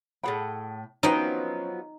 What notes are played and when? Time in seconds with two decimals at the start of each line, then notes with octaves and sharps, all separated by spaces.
0.24 A2 C4 G#4 F#5 G5 B5
1.03 F3 F#3 B3 C#4 D#4 C5 C#5 G5